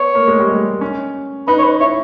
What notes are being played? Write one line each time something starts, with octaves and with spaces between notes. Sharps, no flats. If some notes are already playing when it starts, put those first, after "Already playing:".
Already playing: B3 C#5
A#3
G#3
G3
G#3
C#4
D#4 B4
C#5
B4
E4 C#5